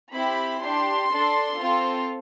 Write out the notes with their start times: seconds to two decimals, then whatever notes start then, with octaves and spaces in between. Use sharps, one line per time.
0.14 C4 E4 G4 B5
0.62 D4 G4 C6
1.12 D4 A4
1.60 C4 F4 A4